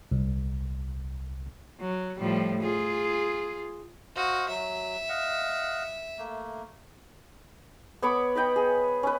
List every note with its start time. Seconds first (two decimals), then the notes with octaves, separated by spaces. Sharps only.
0.11 C2
1.80 F#3
2.19 A2 F3 G3
2.62 F4 G#4
4.16 F#4 C5 D#5 F5
4.49 F#3 E5
5.09 D#5 F5 F#5
6.18 A3 A#3
8.02 B3 C#5 B5 D6
8.35 B4 D#5 G5 B5
8.56 G#4
9.03 C#4 B4